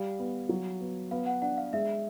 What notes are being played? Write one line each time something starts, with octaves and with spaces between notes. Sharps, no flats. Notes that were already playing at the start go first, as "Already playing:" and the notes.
Already playing: G3 F5
B3
F#3
B3
B3 F5
F#5
D4 F#5
F5
G#3 E5